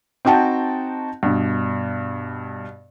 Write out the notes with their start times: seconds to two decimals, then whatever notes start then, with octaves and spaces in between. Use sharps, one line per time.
0.25 C4 D#4 F#4 G5 A5
1.23 G2 B2